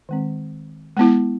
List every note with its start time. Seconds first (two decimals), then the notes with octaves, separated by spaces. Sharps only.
0.09 D#3 G#3 C4
0.97 G#3 B3 E4